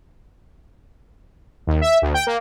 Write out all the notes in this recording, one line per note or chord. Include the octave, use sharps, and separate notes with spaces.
D#2
E5
D2
G5
A#3